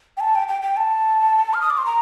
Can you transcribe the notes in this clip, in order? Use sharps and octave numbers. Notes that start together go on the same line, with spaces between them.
G5
A5
G5
G5
G5
A5
F6
D#6
D6
C6
A#5